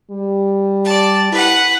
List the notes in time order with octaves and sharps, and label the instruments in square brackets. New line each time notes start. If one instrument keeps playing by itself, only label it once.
[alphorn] G3
[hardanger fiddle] D5 A5
[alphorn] E4 [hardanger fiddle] B4 F#5